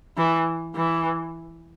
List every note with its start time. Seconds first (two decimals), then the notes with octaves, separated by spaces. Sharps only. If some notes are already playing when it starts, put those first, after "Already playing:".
0.18 E3
0.76 E3